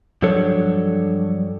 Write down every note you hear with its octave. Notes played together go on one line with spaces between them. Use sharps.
G2 F3 F#3 D4 A4 C#5